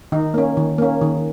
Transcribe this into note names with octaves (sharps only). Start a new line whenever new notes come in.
D#3 D#4
A#3 C#4
D#3
A#3 C#4
D#3